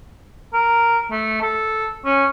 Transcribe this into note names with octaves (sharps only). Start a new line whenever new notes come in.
A#4
A3
A4
C#4